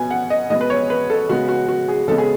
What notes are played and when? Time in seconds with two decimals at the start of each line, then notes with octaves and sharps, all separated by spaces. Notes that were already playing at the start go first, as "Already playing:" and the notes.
Already playing: B2 F#3 B3 G#5
0.11 F#5
0.30 D#5
0.50 B2 G#3 B3 D#5
0.61 B4
0.70 C#5
0.90 B4
1.10 A4
1.29 C#3 G#3 B3 F#4
1.48 F#4
1.69 F#4
1.88 G#4
2.08 C#3 G#3 B3 A4
2.18 G#4